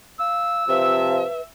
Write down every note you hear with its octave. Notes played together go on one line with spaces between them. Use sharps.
F5 E6
C3 F3 B4 E5